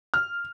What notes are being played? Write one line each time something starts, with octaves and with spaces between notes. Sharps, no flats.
F6